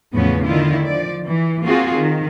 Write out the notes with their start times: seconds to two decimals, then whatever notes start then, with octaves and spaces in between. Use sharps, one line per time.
0.14 E2 A2 C#3 F3 B3 C#4
0.46 D3 D#3 E4 F4
0.86 F3 D5
1.25 E3
1.65 A#3 C4 F4 F#4 G#4
1.95 D#3